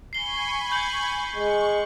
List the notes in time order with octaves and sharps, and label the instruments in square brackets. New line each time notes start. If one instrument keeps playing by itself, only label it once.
[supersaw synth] G#5 B5 C#6 [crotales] C7 G7
[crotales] G6 F#7
[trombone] G#3 [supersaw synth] C#6